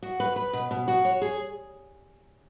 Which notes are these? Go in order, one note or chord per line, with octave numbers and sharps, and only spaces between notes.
F#4
B4
B4
B2
B2
F#4
C#5
G#4